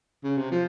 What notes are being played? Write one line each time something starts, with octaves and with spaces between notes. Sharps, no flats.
C#3
C3
F3